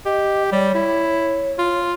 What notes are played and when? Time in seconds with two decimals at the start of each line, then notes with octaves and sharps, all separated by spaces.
0.05 G4 D#5
0.52 G3 C#5
0.75 E4
1.59 F4